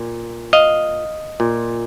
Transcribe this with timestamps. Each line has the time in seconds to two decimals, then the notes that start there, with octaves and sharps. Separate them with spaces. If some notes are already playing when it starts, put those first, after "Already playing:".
Already playing: A#2
0.53 D#5 F5
1.40 A#2